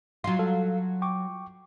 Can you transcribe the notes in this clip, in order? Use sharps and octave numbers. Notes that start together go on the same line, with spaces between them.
F#3 F4 C6
A4 F5
G5 C#6 D6